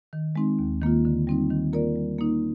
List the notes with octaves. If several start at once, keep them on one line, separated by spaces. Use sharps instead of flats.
D#3
G#3 C4 D#4
D#2
D#3 A#3 F4
D3
G3 C4 D#4
D#3
A#3 F4 A#4 D5
G3
A#3 D#4